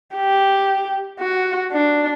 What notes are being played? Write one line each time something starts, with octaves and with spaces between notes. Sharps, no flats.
G4
F#4
D4